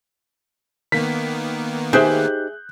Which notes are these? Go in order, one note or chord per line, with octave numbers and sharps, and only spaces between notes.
D#3 A#3 B3 B6
D#4 G4 G#4 C5 E5 F#6 G6